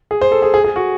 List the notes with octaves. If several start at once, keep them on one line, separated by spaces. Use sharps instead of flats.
G#4
C5
A4
G#4
G#4
G#4
F#4